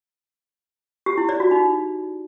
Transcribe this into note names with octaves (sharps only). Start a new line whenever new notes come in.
G4
E4
D5
F#4
D#4